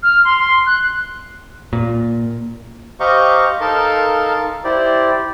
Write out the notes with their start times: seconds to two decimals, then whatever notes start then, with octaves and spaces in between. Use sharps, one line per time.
0.03 F6
0.25 C6
0.39 C6
0.66 F#6
1.73 A#2
3.00 G4 C5 D#5 F5 A#5 C#6
3.61 D#4 A4 A#4 F5 A5 C6
4.64 E4 G4 C5 D5